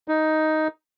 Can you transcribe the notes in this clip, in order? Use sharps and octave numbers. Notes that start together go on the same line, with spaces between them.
D#4